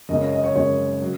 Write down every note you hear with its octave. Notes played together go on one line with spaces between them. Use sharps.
F#1 F#2 C#3 G#3 D#5
C#5
D#5
C#5
F#1 F#2 C#3 G#3 C#5
F#3